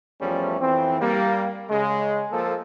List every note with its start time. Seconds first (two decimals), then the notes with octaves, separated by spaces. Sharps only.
0.20 E2 F3 G3 A3 C#4
0.61 F2 E3 C4
1.01 G3 A#3
1.70 C#3 G#3
2.31 F3 A#3 A4